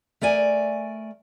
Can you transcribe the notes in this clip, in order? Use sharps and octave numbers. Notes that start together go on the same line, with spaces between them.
A3 A#4 D5 G#5